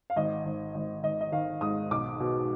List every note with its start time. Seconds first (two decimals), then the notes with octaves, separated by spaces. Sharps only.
0.10 F5
0.16 G#1 D#5
0.45 G#1
0.74 G#1
1.03 G#1 D#5
1.21 D#5
1.32 D#3 F5
1.61 G#2 D#6
1.91 B1 D6
2.20 B2